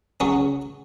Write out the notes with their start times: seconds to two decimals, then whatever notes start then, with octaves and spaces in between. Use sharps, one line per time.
0.20 C#3 F#3 C#4 G#4 C#5